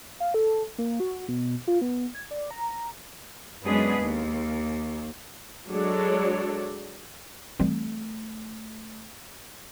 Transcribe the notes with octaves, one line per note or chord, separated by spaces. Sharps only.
F5
A4
A#3
F#4
B2
F4
B3
G#6
D5
A#5
F#2 G#3 B3 D4 G#4 B4
D#2
F#3 G#3 D4 A4 C#5 D5
E3 G3 A3 C4